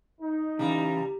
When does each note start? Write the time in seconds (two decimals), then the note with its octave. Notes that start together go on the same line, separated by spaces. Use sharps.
0.21 D#4
0.59 C#3 E3 G3 A#5